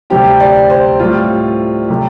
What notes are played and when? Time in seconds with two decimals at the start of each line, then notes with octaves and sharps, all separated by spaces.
0.10 D2 C3 G3 C4 G4
0.40 D5
0.70 C5
0.99 A2 G3 C4 F4
1.88 C3 A3 G4